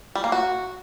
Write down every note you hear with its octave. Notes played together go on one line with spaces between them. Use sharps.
G3
A#3
F#4